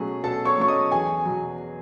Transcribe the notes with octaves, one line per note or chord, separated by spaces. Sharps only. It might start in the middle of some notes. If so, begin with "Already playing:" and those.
Already playing: B2 F#3 A3 C#4 G#4
B2 A4 A5
C#5 C#6
F#3 A3 C#4 C#6
D#5 D#6
E2 G#4 G#5
B2 F#3